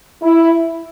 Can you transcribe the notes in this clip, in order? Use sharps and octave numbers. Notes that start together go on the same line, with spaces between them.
E4